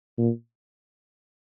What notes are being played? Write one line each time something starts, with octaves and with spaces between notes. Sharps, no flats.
A#2